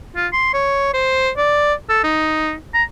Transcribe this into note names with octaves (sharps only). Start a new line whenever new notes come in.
F4
C6
C#5
C5
D5
A4
D#4
A#5